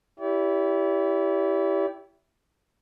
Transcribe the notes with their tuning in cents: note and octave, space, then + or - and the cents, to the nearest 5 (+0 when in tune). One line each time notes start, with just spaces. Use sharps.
E4 +0 G4 +0 D5 -45